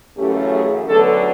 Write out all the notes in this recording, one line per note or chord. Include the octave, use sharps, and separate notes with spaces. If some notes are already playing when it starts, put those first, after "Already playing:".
F#2 C#3 E3 A3 C#4 G4
G#4
D2 D3 F#3 B3 A4